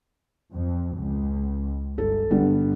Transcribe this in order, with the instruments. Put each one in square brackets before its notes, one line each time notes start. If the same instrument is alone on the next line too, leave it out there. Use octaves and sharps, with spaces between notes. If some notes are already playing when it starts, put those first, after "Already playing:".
[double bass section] F2
C#2
[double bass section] G1 [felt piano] A4
[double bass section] G1 [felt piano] D3 G3 B3